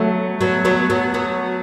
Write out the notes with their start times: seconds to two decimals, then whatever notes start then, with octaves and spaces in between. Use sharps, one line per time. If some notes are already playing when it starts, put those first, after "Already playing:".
Already playing: F#3 A3 B3
0.41 F#3 B3
0.65 F#3 B3
0.90 F#3 B3
1.14 F#3 B3